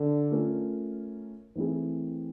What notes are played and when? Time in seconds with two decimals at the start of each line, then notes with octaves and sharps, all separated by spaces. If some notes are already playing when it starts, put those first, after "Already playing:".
Already playing: D3
0.31 A3 C#4 F4 A#4
1.55 E3 A3 C4 E4 G#4